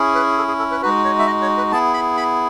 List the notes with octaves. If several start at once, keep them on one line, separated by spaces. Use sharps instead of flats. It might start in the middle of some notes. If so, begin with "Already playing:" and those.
Already playing: C#4 E4 G#4
B4
A4
G#4
A4
B4
G#3 D#4 F#4 B4
C#5
E5
D#5
C#5
B4
B3 E4 G#4 A5
B5
B5